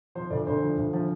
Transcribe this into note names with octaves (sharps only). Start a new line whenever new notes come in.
F3 C5
D2 D5
D2 C5
F3
D2
F3